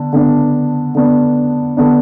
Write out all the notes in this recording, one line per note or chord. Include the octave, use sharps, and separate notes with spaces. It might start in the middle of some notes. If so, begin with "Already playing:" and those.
Already playing: D3 B3 D4
D3 B3 D4
D3 B3 D4
D3 B3 D4